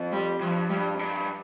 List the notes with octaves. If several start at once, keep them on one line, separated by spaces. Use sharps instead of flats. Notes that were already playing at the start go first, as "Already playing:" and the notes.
Already playing: F2
G3
G2 F3
G2 G3
F2
G2